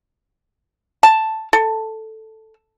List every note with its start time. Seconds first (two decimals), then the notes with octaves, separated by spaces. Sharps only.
1.03 A5
1.53 A4